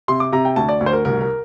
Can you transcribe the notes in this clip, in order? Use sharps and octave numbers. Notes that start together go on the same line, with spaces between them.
C3 C6
D6
C3 A#5
G5
D2 A5
D5
D2
C5
A#4
C2 A#4
A#4